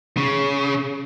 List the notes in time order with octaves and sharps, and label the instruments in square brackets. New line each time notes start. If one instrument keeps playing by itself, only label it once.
[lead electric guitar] C#3